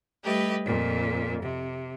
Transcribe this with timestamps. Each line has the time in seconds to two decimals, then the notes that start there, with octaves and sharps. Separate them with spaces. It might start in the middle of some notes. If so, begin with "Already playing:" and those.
0.23 G3 A3 G4 B4 D#5
0.65 F2 A#2
1.42 C3